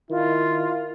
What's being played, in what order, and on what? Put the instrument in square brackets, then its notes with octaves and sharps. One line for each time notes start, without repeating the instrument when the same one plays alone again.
[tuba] D#3 [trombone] E4 [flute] F4